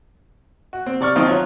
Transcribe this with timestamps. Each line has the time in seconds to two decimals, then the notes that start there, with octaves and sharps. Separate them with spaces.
0.73 F#4
0.86 C4
1.00 C3 D5 C#6 F6
1.16 D#3 F3 C4 D#4 F4
1.27 F#3 F4 C#5